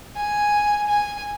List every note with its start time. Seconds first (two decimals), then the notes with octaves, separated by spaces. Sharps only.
0.16 G#5
0.87 G#5